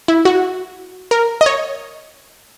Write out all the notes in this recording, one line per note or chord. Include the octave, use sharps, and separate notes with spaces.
E4
F#4
A#4
D#5
C#5